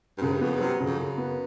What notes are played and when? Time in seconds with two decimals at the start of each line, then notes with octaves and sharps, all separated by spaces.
0.18 G2
0.22 F#2 C#3
0.32 G2
0.41 F2 B3
0.51 F#2
0.56 C#3
0.60 C3 F#3
0.80 C#3
0.86 F2
0.99 F#2 C#3
1.18 B3